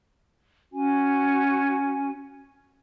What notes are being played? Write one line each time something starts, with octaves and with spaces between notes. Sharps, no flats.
C#4 F#4 G#5